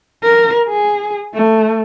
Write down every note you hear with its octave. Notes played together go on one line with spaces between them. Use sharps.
A#4
G#4
A3